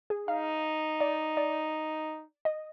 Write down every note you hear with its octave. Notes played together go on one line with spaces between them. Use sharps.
G#4
D#4 F5
D5
D5
D#5